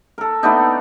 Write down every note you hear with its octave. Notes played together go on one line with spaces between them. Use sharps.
A4 A#4
A3 B3 D4 D#4